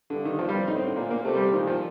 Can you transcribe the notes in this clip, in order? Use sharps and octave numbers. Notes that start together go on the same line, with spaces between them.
G2 D3
D#3
G2 F3
G3
C4
A2 D#4
C4
D3
A#2 A#3
A#3
C3 A3
G3
A#2 D#3
F3